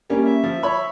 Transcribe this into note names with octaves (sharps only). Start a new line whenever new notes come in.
G3 A#3 C#4
E5
F3
C#5 B5 C#6